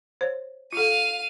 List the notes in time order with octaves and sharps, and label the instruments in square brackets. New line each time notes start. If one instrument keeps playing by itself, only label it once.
[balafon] C5 C#5
[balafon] F4 A4 [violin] F5 D#7